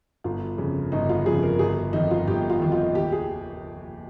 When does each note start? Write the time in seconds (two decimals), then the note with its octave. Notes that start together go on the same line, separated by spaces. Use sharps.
0.24 G1 F4
0.58 F2 C#3 F3
0.92 G1 D#4
1.09 F4
1.26 F2 C#3 F3 G#4
1.43 A#4
1.59 G1 G#4
1.93 F2 D#3 D#4
2.11 F4
2.27 G1 G4
2.50 F4
2.61 F2 D#3
2.72 F4
2.95 D#2 G4
3.12 G#4